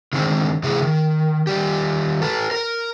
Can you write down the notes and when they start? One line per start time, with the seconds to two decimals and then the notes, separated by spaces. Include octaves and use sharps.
0.13 D3 D#3 G#3 C4
0.63 C3 E3 G#4
0.82 D#3
1.47 D#3 G3 G4
2.22 A4 B4
2.51 A#4